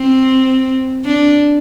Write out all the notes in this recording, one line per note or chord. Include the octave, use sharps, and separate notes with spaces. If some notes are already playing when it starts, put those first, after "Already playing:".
Already playing: C4
D4